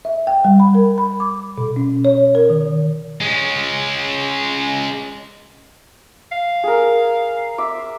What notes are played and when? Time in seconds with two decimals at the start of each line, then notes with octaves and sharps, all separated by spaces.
0.05 E5
0.27 G5
0.45 G3
0.60 B5
0.75 A#4
0.98 B5
1.20 D6
1.58 B2
1.76 C#4
2.05 C#5
2.35 A#4
2.50 D#3
3.21 G#3 C#4
6.32 F5
6.64 G#4 A#4
7.58 E5 D6